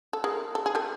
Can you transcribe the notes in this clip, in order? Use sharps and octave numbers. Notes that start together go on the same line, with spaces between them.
A4
G#4 A#4
A4
G#4
G4 A4